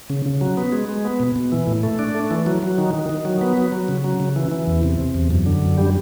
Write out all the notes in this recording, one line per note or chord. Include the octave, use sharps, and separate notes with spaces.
C#3
C#3
F#3
B3
G#3
G#3
B3
B2
B2
E3
A2
A3
D4
A3
E3
F#3
F#3
D#3
D#3
D#3
F#3
B3
F#3
F#3
C#3
F#3
C#3
E3
E3
E2
C3
C3
E2
F#2
D3
F#2
G3